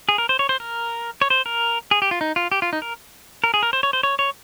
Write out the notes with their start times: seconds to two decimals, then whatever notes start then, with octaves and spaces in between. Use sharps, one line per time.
0.09 G#4
0.18 A#4
0.29 C5
0.39 C#5
0.49 C5
0.60 A#4
1.22 C#5
1.30 C5
1.46 A#4
1.91 G#4
2.02 G4
2.11 F4
2.21 D#4
2.36 F4
2.52 G4
2.62 F4
2.73 D#4
2.82 A#4
3.44 A#4
3.54 G#4
3.63 A#4
3.73 C5
3.83 C#5
3.93 C5
4.03 C#5
4.19 C#5